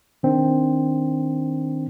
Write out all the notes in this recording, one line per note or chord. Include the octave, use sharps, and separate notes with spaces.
D#3 C4 D4